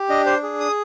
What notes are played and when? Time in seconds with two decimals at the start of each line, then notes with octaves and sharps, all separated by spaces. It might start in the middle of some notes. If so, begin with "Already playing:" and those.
Already playing: G4
0.09 D4 D#5
0.26 C5
0.43 G#4
0.60 D#6